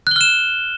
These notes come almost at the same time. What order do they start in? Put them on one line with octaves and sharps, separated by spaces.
F#6 G7 F6 E7